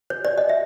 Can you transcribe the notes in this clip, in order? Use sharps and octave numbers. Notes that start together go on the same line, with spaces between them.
C#5
D5
D#5
E5